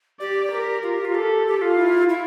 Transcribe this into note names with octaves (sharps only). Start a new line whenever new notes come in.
G4 D5
A#4
F4
G4
F4
G4 A4
G4
F4
E4
E4